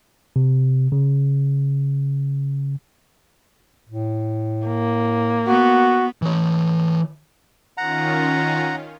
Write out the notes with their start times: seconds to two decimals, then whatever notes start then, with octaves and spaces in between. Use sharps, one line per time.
0.36 C3
0.92 C#3
3.89 A2
4.67 A#3
5.48 B3 F#4
6.22 E3 C#5
7.78 D#3 C#4 F4 F#5 A#5